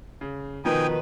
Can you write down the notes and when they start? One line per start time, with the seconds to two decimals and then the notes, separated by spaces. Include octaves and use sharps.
0.21 C#3
0.65 B2 D#3 F3 D#4 B4 G5 G#5